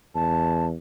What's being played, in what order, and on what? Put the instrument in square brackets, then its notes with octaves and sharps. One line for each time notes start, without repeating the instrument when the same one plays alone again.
[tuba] E2 [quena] A5